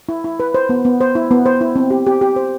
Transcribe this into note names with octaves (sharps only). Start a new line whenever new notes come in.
E4
E4
B4
C5
B3
B3
C5
E4
B3
C5
E4
C4
G4
G4
G4
C5